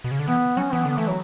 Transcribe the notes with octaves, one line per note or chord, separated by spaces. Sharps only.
B2
C#3
D3
E3 B3
F#3 C#4
E3 B3
D3 B3
E3 A3
F#3